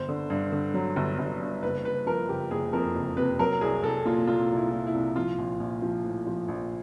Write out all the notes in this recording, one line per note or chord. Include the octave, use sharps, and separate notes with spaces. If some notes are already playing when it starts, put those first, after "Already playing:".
Already playing: G1 C5
D3
G2
D3
F#3
G1
G1
G2
F#1 B4
F#1 B4
F3 A#4
F#1 G4
F#1 G#4
F2 A#4
F#1
C3 B4
F#3 A#4
C2 G#4
C2 A4
A#2 F4
A#2 F4
C2
E4
A#2
E4
C2
F3 F4
A#1
A#1
F3
A2
F3
A#1